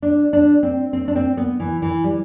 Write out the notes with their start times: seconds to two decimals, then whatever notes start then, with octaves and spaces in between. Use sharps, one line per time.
0.02 D4
0.33 D4
0.63 C4
0.93 C4
1.08 D4
1.16 C4
1.37 B3
1.60 E3
1.82 E3
2.04 G3